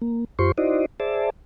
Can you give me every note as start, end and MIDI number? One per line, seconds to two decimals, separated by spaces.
0.02 0.25 58
0.39 0.52 42
0.39 0.52 65
0.39 0.52 67
0.39 0.52 72
0.39 0.52 84
0.39 0.52 85
0.58 0.86 63
0.58 0.86 64
0.58 0.86 66
0.58 0.86 72
0.58 0.86 74
0.58 0.86 75
1.00 1.30 68
1.00 1.30 72
1.00 1.30 74
1.00 1.30 76
1.00 1.30 81